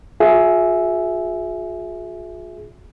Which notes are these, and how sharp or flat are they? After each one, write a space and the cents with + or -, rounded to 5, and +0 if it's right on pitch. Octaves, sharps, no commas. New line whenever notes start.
F4 +45 G#4 +15 E5 +0